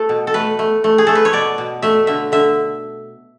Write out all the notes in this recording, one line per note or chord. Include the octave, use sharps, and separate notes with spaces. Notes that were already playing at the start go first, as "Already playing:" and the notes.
Already playing: A3 A4
B2
A4
A3 B4
A3
A3
G#4
A3 A4
B4
C#5
B2 D5
B2
A3 E5
D3 E5
D3 E5